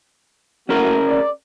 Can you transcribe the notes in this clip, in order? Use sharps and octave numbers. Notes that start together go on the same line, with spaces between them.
A3 A#3 C#4 F#4 G#4 A#4
D5